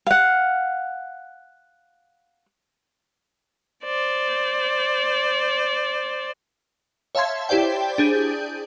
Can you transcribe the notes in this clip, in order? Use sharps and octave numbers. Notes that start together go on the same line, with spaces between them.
F5 F#5
C5 D5
C#5 E5 F5 A5 C6 G#6
E4 G4 C5 D5 G5
D4 G#4 G6